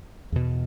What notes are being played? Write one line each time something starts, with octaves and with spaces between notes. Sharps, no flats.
E2 B2